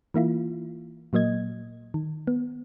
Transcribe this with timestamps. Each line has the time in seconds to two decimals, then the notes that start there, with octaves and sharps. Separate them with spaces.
0.14 E3 A#3 E4 F4
1.13 A#2 F#3 A#3 D#5 G#6
1.94 D#3
2.27 B3